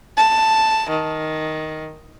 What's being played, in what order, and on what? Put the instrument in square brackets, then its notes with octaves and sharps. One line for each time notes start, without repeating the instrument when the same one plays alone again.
[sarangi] A5
D#3